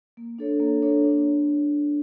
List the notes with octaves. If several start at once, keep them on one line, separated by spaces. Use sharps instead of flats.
A#3
D4 A4 C#5
A#3
D4 A4 C#5
D4